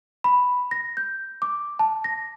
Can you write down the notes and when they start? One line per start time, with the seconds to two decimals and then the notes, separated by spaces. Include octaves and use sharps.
0.24 B5
0.71 A#6
0.97 G6
1.42 D6
1.79 A5
2.04 A#6